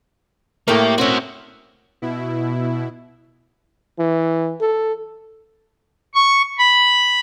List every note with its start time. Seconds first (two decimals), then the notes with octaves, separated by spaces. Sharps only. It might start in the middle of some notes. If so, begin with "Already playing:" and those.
0.68 A2 A3 A#3 G4 A#4 G5
0.98 C4 C#4 F#4 E5
2.02 B2 E4
3.99 E3
4.61 A4
6.14 C#6
6.59 B5